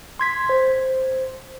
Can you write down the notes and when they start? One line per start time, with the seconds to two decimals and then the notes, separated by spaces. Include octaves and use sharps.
0.19 C6 G#6 B6
0.49 C5